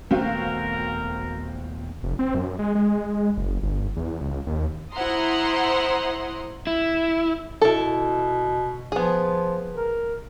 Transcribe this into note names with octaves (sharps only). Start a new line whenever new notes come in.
D#1 A3 B3 C4 F#4 A#4 F5
F1
C4
F#2
G#3
G#3
F#1
G1
E2
C#2
D#2
E4 C5 F#5 A#5 C6 D#6
E4
B2 E4 A4
F3 B3 G#4
A#4